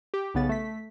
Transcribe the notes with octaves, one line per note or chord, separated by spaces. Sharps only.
G4
B1 C#3 B3 A6
A3 B6